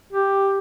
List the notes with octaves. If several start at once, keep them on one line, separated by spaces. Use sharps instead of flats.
G4